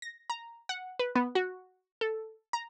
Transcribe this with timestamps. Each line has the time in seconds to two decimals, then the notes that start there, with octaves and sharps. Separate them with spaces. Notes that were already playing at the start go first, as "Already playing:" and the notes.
0.02 A#6
0.30 A#5
0.69 F#5
0.99 B4
1.15 B3
1.35 F#4
2.01 A4
2.53 A#5